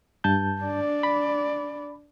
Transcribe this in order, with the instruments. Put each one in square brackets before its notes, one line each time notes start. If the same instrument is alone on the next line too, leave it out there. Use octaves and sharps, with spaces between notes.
[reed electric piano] G2 A5 G6
[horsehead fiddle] D4 D5
[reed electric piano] B5